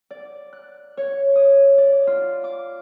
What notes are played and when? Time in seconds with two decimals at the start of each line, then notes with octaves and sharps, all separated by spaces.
0.10 D5
0.53 F#6
0.97 C#5
1.36 D#6
1.78 D5
2.07 F4
2.44 D6